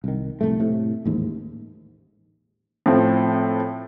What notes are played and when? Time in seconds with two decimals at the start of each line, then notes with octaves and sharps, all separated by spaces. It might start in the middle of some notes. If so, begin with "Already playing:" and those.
0.04 C2 D#3
0.41 F1 C2 A2 A3
0.60 A2 C3 A3
1.06 A1 D#2 G#2
2.86 A2 F3 C4